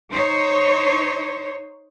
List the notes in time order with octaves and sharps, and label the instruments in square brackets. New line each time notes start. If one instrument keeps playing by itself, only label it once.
[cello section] D#4 C5 C#5